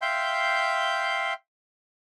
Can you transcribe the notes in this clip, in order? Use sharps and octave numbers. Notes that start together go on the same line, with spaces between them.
E5 F5 G5 C6 G6